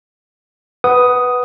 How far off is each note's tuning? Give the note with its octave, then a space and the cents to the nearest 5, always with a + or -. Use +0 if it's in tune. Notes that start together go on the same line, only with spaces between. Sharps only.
B4 +0 F#5 +10 D#6 +0